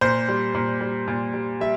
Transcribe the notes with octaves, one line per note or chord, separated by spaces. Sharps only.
A#2 C5
G3
A#2
G3
A#2
G3
G3 E5